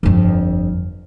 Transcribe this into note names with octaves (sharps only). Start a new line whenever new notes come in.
G1 F2